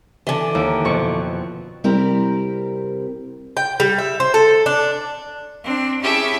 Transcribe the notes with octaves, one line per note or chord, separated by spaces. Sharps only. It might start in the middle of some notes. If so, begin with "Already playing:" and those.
D3 E3
D#2
F2 B2 C#6
C3 G3 C4 E4 G4 A#4
G5
G3
E5
C5
A4
D4
C4 D4
C#4 E4 G4 G#4 E5 A5